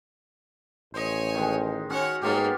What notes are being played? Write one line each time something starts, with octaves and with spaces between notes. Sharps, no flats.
A1 C5 C#5 D#5 G#5
D#3 G#3
C#4 F#4 C#5 F#5
G#2 A#3 B3 F4 G4 C#5